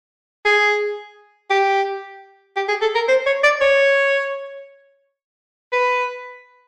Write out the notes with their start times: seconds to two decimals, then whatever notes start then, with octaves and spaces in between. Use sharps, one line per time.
0.45 G#4
1.50 G4
2.56 G4
2.69 G#4
2.82 A4
2.95 A#4
3.08 C5
3.26 C#5
3.44 D5
3.61 C#5
5.73 B4